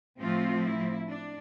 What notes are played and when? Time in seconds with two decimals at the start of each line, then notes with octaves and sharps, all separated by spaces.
0.19 A2 F3 A3 C4 F4
0.65 E4
1.09 D4